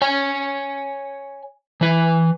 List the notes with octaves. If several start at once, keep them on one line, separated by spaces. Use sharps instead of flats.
C#5 G#5
E3 B4